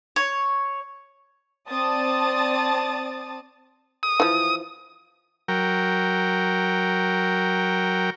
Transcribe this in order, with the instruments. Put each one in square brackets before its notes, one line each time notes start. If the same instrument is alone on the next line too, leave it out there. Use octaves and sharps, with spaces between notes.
[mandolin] C#5
[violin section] C4 D5 A5 D#6 A6
[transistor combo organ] D#6
[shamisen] E3 F3
[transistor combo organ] F#3 A#4 G5